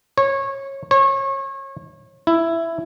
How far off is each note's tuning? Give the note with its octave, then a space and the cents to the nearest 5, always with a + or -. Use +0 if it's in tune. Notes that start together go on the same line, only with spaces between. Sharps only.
C#5 -20
C#5 -30
E4 +10